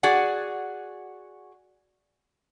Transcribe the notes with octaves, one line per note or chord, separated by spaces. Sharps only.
F#4 G#4 D5 F#5